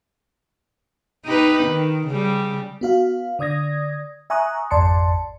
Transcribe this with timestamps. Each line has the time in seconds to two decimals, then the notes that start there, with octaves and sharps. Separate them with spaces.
1.25 D#4 G4 B4
1.64 D#3
2.08 C#3 G3
2.81 B3 F#4 F5
3.39 D3 D5 D#6 G#6 A#6
4.30 E5 G#5 A#5 C#6 D#6 F#6
4.71 G#1 F2 D5 A5 C6 C#7